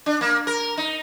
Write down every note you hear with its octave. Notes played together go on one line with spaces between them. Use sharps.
D4
A#3
A#4
D#4